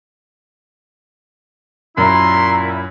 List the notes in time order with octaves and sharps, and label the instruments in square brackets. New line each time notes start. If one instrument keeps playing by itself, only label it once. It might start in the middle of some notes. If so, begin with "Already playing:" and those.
[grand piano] F#2 [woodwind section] A#2 E4 [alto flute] A#5 [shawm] C6